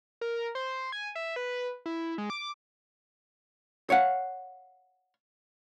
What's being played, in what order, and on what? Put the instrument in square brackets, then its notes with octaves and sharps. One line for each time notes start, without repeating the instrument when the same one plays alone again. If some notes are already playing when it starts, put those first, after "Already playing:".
[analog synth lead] A#4
C5
G#5
E5
B4
E4
G#3
D6
[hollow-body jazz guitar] C#5 F5 F#5